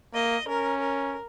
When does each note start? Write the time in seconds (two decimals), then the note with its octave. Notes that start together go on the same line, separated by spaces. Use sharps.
0.14 A#3 D#5
0.48 C#4 A#4
0.81 A#4